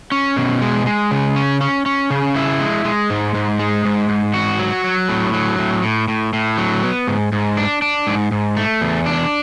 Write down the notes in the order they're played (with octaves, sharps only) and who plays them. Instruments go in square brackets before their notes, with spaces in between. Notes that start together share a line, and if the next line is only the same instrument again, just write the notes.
[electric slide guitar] C#4
B2
G#3
G#3
C#3
C#4
C#4
C#4
C#3
E4
G#3
G#3
G#2
G#2
G#3
G#2
G#2
F#4
F#3
F#3
A2
F#3
A2
A2
A2
A2
F#3
B3
G#2
G#2
D4
D4
G#2
G#2
A3
E2
D4